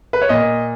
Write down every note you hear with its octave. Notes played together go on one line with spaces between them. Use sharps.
B4
C#5
A#2 D#5